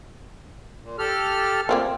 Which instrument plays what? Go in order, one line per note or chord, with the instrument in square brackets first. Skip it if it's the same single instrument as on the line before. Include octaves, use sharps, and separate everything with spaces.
[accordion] A#2
G4 A4 F6
[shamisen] A#3 C4 F4